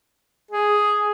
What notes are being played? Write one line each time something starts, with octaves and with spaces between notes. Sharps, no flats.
G#4